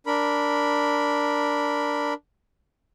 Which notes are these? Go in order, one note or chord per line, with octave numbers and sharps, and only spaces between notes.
D4 A#4 B5